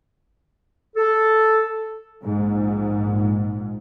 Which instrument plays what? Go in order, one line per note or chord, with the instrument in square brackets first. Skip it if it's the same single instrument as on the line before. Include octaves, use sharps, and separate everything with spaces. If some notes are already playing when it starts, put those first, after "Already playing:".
[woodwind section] A4
[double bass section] A#1 G#2